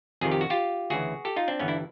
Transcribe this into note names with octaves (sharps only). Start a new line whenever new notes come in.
F2 C3 D#3 G#4
G4
F#4
F4 G4
D2 C#3 E3 F#4 G#4
G4 A4
D#4 F4
C4 D4
G1 G2 E3 B3 C#4
D4 E4